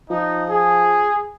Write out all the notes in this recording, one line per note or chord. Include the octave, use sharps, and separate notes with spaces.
F3 D#4
G#4